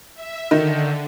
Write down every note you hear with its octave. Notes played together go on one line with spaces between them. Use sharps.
E5
D3 D#3